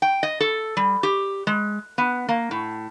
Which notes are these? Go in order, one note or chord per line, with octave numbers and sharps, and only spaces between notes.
G5
D#5
A4
G3
G4
G#3
B3
A#3
A2